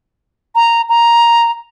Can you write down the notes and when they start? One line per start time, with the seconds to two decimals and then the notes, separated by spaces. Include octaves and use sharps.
0.55 A#5
0.89 A#5